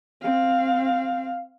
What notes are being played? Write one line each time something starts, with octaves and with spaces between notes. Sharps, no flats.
C4 F5